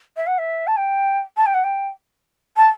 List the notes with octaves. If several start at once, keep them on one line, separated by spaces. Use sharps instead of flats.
E5
F#5
E5
A5
G5
A5
G5
F#5
G5
A5